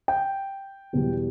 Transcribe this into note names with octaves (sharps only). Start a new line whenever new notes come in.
G5
E2 B2 G3